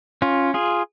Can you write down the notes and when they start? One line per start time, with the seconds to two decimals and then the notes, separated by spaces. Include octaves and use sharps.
0.22 C#4 F4
0.54 F4 G#4